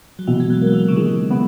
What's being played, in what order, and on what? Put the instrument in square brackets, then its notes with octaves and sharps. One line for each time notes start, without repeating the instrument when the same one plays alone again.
[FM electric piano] F#3
[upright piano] B2 [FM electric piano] E3
[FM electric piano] G#3
F#3
[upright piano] A#3
[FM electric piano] F#3
E3
C#3
[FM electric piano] D#3 [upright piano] G#3
[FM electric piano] C#3 [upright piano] B3